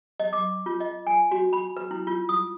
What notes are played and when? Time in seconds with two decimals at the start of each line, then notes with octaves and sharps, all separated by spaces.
0.20 D#5
0.33 D6
0.66 F4
0.80 D#5
1.07 G#5
1.31 F#4
1.53 B5
1.77 B4
1.91 E4
2.07 F4
2.29 D#6